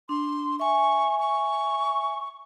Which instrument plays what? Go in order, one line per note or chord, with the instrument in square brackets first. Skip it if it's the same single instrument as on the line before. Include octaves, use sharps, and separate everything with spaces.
[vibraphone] D4 [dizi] C6
[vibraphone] E5 G#5 [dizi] C#6
[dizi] C#6